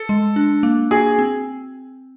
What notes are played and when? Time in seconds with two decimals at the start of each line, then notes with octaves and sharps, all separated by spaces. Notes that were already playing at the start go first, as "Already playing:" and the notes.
Already playing: A4
0.09 G#3
0.36 D4
0.63 A#3
0.91 F#4 G#4
1.19 C4